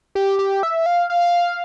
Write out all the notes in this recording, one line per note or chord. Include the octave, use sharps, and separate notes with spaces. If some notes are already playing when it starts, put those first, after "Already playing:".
G4
G4
E5
F5
F5